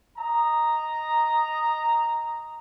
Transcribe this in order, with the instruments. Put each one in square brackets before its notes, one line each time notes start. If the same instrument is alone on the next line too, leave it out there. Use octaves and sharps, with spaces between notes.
[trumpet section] D#5 A#5